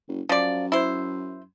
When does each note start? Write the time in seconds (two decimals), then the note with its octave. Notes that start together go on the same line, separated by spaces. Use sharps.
0.08 F#1
0.29 F#2 F3 D5
0.72 E4 C5